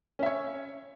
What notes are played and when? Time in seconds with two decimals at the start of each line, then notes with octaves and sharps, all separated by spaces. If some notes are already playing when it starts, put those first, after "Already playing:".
0.19 C#4
0.23 E5
0.26 C#5